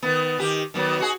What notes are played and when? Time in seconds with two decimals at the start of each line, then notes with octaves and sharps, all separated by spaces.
0.02 D#3 B3
0.39 D#3 G4
0.74 D#3 F#3 B3
1.00 F#4 G#4